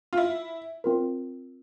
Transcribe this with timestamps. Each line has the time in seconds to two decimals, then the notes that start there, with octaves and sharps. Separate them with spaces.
0.13 F4
0.17 E4
0.84 C4 F4 A#4